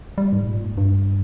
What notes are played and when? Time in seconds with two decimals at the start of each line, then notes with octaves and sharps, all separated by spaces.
0.18 G3
0.33 G#2
0.47 A#2
0.63 G#2
0.78 G2